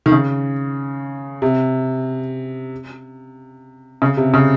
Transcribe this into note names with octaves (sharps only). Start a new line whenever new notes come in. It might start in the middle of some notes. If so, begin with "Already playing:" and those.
D#3
C#3
C3
C#3
C3
C#3